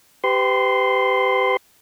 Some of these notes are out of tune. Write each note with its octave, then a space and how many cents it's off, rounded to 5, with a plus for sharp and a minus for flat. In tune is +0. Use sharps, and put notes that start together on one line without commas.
G4 +0 B4 +40 C6 -5